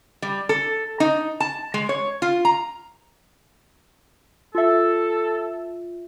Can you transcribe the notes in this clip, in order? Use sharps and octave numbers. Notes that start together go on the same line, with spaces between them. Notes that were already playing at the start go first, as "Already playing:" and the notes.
G3
A4
D#4
A5
G#3
C#5
F4
A#5
F4 A4 E5